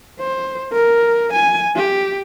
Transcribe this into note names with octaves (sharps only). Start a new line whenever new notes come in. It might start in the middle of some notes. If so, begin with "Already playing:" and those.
C5
A#4
G#5
G4